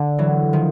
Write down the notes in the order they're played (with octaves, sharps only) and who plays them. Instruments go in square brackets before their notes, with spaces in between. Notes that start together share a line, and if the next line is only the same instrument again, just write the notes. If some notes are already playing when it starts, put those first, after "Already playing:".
Already playing: [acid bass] D3
[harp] E3 F#3
D#3 F3